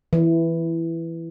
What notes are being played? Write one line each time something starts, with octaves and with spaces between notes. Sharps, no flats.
E3